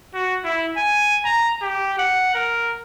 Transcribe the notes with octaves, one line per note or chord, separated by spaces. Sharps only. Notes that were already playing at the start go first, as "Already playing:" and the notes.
F#4
E4
G#5
A#5
G4
F#5
A#4